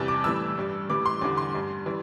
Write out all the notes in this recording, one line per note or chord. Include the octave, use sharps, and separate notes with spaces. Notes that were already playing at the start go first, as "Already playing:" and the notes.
Already playing: E2 C3 E3 G3 A5
D6
A2 E3 G3 E6
G2 G3
A2 E3 G3 D6
C6
E2 D3 G3 D6
C6
G2 G3
E3 G3